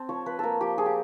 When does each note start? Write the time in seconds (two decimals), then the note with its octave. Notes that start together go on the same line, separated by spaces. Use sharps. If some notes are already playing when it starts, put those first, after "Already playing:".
Already playing: C4 A5
0.09 F3 C#5
0.26 F3 B4
0.39 A#3 A4 A#4
0.61 F3 G4
0.78 F3 G#4
0.86 G4